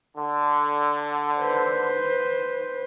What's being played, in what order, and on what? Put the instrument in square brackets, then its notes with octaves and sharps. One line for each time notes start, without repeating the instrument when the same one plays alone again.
[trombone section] D3
[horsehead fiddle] B4 C5